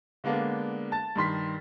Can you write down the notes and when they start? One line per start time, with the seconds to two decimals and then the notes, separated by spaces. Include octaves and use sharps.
0.24 D3 G#3 A#3 B3 D4
0.92 A5 A6
1.16 G2 D#3 C6 B6